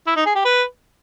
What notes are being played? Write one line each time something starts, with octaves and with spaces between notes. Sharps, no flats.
E4
D#4
G#4
G4
B4